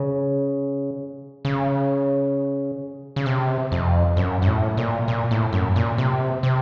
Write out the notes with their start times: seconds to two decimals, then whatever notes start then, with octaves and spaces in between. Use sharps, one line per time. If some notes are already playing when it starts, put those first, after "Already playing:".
Already playing: C#3
1.45 C#3
3.16 C#3
3.26 C3
3.72 F2
4.17 F#2
4.42 F#2
4.47 A2
4.77 A#2
5.08 A#2
5.31 A2
5.53 F#2
5.76 A#2
5.98 C3
6.43 C3